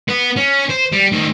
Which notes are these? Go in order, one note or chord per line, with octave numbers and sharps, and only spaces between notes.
B3 B4
C#4
C5
G3
D#3 A3